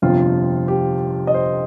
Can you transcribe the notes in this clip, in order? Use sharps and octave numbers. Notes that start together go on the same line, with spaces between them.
G1 F2 C3 F3 F4
G4
D#5
C5